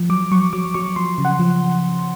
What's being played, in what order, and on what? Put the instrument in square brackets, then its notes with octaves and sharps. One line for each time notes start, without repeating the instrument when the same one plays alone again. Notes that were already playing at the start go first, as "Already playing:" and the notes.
Already playing: [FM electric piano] F3
F#3 D6
F#3 C#6
F#3 D6
F#3 C#6
F3 C6
C#3
F#5
F3